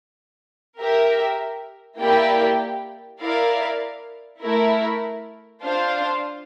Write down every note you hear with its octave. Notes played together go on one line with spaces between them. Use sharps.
G4 A#4 E5
A#3 E4 G4 D5 G5
E4 A#4 D5 F5
A3 E4 A#4
D4 F4 C5 F5